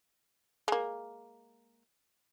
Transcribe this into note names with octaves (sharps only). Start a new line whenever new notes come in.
G#3 A#3